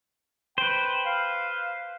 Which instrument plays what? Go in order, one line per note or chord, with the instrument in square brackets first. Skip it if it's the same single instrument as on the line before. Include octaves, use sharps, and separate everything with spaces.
[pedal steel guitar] B4 C5 [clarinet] G5
[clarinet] F5